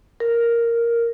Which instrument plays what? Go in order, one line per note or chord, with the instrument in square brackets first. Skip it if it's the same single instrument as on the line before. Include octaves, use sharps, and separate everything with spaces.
[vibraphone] A#4